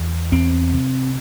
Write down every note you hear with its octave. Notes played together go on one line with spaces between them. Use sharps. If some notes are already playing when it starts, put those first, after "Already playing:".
Already playing: E2
E2 C4
C3